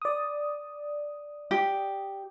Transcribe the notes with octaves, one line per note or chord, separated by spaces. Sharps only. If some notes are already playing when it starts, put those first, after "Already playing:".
D5 D#6
G4